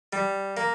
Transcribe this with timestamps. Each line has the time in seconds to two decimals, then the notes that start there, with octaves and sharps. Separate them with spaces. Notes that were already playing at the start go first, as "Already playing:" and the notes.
0.13 G3
0.57 A#3